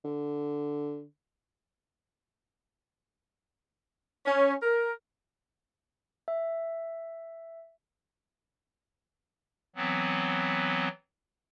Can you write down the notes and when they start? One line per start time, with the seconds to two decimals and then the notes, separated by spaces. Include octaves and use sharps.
0.04 D3
4.26 C#4
4.62 A#4
6.28 E5
9.76 E3 F#3 B3 C4